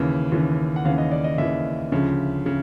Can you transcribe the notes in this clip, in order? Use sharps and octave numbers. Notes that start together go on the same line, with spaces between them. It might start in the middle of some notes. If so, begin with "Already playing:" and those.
Already playing: D#2 C#3 E3
D#2 C#3 E3
F#5
D#2 C#3 E3 F5
D#5
D5
D#5
D#2 C#3 E3 E5
D2 C#3 F3
C#3